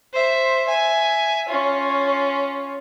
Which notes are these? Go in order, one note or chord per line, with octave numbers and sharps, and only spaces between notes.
C5 E5
E5 G#5
C#4 F4